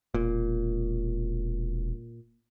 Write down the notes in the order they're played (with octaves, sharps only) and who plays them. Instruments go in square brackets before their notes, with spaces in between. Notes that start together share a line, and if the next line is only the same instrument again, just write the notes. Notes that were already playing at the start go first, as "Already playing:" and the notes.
[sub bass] E1 [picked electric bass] A#2